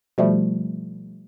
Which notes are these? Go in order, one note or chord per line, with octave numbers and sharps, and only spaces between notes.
B2 F3 G3 A3